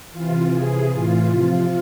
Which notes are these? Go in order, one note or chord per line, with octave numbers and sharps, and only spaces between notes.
C3 E3 F4
C3 E3 G#4
A2 E3 F4
C3 F3 F4